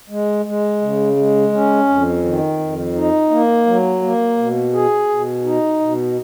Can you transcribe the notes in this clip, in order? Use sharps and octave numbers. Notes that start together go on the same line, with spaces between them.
G#3
G#3
C#3
G#3
C#4
F2
D#3
F2
D#4
A#3
F#3
A#3
B2
G#4
B2
D#4
B2